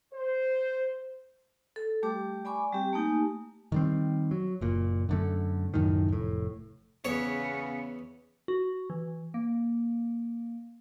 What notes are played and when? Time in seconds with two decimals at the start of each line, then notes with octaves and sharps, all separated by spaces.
0.14 C5
1.76 A4
2.03 G3 A3 G4 D6
2.45 D5 G#5 B5 C#6 D6
2.72 G3 C4 G4
2.93 A3 A#3 D#4 G4 G#5
3.72 D#3 G3 C4
4.31 F#3
4.61 F#1 A#2
5.09 F#2 D3 A3
5.74 C#2 F#2 A2 D#3
6.08 F1 A2
7.05 E2 C#3 B3 C#5
8.48 F#4
8.90 E3
9.34 A#3